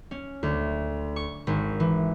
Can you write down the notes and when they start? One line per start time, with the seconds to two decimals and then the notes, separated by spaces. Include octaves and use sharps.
0.11 C#4
0.43 D2
1.16 C#6
1.47 G#1
1.80 E3